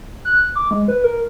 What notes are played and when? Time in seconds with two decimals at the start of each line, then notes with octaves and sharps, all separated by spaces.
0.25 F#6
0.56 D6
0.71 G#3
0.88 B4
1.04 A#4